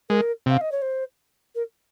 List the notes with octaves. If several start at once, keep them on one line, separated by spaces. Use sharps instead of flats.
G#3 A#4
C3 F5
D#5
C#5
C5
A#4